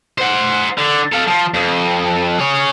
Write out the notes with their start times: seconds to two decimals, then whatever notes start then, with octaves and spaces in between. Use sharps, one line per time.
0.18 C5 F#5
0.78 D3
1.12 A4 F5
1.27 F3
1.54 F2
2.39 G#4 C#5